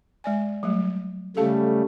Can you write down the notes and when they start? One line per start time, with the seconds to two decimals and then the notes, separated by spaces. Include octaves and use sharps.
0.24 G#3 D5 G#5
0.63 F#3 G3 A3
1.37 C#3 G3 A3 A4 F5 A5